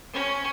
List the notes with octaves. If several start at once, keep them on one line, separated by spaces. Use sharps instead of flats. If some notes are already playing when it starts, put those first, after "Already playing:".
C#4